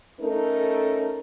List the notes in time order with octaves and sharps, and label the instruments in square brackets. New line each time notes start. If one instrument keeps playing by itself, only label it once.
[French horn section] A3 C#4 D#4 A4 A#4